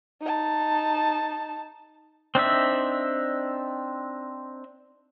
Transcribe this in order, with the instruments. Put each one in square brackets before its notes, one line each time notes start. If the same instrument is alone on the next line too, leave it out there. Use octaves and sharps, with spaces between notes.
[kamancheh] D#4 A5
[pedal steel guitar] C4 D4 D#4 E5